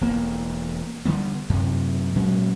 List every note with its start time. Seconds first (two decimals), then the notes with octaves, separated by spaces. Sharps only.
0.01 E1 E2 A#3
1.05 D3 F#3 G3 B3
1.50 F#2 C3
2.15 A#2 F#3 G#3 C#4